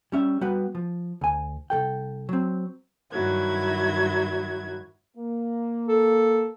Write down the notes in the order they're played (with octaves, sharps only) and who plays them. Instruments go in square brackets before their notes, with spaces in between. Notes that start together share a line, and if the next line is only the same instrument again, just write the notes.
[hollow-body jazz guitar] G3 C#4 E5
G3 B3 F#4 B4
F3
D2 G#5
C2 B2 A4 G5
F#3 C4
[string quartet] G2 D#3 F#3 E4 G#6
[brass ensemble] A#3
[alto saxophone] A4